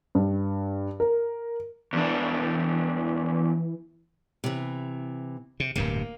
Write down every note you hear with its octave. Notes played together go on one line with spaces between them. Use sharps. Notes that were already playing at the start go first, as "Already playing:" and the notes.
G2
A#4
E2 E3 D4
C3 E3
C3
D1 G2 C3 A#3